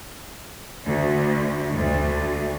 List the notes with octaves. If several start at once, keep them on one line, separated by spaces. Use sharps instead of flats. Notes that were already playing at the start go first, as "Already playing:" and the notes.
D2
D2